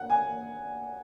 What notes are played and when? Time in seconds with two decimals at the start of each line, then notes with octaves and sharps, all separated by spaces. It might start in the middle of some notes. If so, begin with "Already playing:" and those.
Already playing: F#5
0.10 G#5